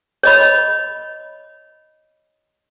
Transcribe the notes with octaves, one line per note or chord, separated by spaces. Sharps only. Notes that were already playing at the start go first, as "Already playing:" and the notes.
C#5 D#5 B5